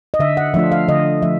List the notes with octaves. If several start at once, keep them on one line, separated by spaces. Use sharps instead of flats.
D#5
D3 E5
F#5
F3 A3 D4 F4 E5
F5
D3 D#5
F3 A3 E5